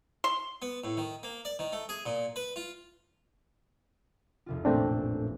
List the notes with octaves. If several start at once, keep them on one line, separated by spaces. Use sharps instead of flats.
C6
B3
A2
D#3
A#3
D5
D#3
A3
G#4
A#2
B4
F4
F1 C2 F4
A1 A#2 A3 C4 D4